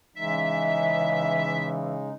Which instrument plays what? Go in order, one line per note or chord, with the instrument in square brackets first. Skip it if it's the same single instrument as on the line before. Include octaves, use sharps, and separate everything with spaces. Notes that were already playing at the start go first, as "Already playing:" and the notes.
[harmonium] C#3 G#3 D#4 [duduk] E3 [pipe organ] E5